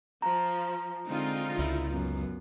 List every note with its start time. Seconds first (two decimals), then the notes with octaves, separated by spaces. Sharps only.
0.22 F3 A#5
1.07 D3 G#3 C4 D#4 F4
1.59 C#2 E4
1.91 F#2 B3